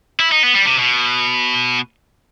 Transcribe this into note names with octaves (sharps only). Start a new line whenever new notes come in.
E4
D#4
B3
G3
C3
B2